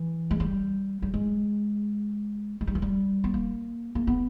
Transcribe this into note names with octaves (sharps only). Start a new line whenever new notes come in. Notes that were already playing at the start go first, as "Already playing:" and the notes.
Already playing: E3
G#3
G3
G3
G#3
G#3
G3
E3
G3
B3
A#3
A#3
B3